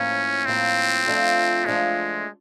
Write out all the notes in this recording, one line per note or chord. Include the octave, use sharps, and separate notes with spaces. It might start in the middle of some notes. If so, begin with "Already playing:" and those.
Already playing: A2 F3 A#3 C#4
A2 F3 A#3 C4
F3 A3 D4 F4 A4
F3 G#3 A3 D4 F4 A4